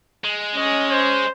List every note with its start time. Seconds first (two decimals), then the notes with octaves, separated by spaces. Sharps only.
0.24 G#3
0.55 C#4 C#5 D#5
0.91 C5